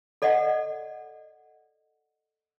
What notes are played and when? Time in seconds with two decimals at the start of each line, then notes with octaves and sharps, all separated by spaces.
0.22 A4 D5 D#5 F#5